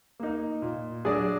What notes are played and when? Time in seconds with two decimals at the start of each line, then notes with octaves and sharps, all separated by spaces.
0.20 A#3 D#4
0.62 A#2
1.05 F#3 D4 G#4 D5